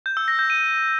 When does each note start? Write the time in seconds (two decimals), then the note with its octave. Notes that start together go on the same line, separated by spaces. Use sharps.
0.06 G6
0.17 E6
0.28 A#6
0.39 G6
0.50 D#7